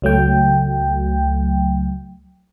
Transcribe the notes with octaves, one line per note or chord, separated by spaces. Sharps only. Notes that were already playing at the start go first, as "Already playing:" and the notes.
C#2 F#3 A3 G5